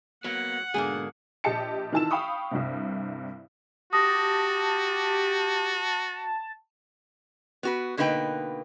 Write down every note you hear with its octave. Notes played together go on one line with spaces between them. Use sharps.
F#3 A#3 B3 F#5
G#2 B2 D3 A#3 D4 G#4
A#1 G4 D#5 A5 C#7
D#3 E3 F4 A5 E6 E7
F5 G5 B5 C#6 D#6
C2 G2 C3
F#4 G4 A5 D#6 A#6
B3 F#4 B4
B2 D3 A#3 D#4 B4 G5